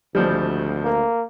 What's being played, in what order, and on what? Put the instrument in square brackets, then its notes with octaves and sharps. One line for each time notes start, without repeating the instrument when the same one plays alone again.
[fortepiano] G#1 F3 G3 [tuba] D2
[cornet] A#3